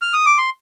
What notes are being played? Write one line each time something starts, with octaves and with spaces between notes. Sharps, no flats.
F6
D#6
D6
C6